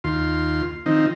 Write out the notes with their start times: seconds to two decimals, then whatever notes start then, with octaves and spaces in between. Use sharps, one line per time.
0.04 D#2 F4 C6
0.86 D#3 F3 C4 D#4